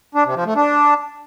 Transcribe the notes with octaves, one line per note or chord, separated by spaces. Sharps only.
D4
C3
F3
A3
D4